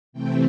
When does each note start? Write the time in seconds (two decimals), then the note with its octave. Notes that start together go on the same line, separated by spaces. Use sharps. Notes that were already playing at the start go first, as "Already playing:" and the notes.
0.13 C3 E3 A3 C4 G5